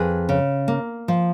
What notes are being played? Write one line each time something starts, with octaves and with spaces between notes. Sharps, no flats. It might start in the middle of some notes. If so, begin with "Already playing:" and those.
Already playing: F2 G#4 B4
C#3
A#3
F3